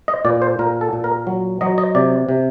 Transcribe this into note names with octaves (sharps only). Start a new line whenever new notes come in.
D#5
A#2 D5
C5
A#2 A#4
A4
A#2
A#4
F#3
F#3 D#5
D#5
C3 D5
C3